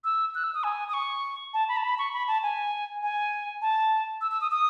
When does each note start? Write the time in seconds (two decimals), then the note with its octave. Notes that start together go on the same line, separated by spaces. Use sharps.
0.04 E6
0.35 F#6
0.44 E6
0.55 D#6
0.64 G#5
0.89 D#6
0.94 C#6
1.54 A5
1.69 B5
1.77 A5
1.84 B5
1.99 C#6
2.13 B5
2.28 A5
2.43 G#5
3.02 G#5
3.62 A5
4.21 E6
4.31 E6
4.41 D#6
4.51 D#6